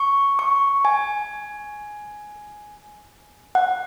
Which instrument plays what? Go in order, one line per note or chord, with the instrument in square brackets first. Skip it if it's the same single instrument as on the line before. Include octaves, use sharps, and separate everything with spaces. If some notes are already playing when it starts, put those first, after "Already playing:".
Already playing: [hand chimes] C#6
C#6
G#5
F#5